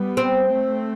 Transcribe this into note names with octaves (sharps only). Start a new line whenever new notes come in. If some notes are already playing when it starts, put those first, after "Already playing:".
Already playing: G3 B3
C4
A3 C4